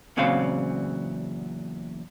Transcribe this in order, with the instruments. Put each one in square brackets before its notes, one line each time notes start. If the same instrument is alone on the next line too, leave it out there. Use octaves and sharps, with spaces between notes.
[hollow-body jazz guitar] E2 A#2 C#3 F#3 C4 F5